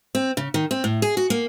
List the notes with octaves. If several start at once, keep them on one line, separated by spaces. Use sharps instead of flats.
C4
C#3
D#3
C4
A2
G#4
F#4
A#3